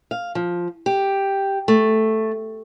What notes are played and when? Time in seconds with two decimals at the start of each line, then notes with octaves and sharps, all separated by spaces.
0.11 F5
0.35 F3
0.86 G4
1.68 A3